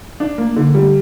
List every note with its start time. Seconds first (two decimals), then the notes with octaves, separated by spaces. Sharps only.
0.20 D4
0.38 A#3
0.56 D3
0.75 G3